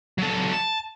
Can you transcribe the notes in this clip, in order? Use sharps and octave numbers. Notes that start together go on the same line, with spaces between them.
F#3 A4
A5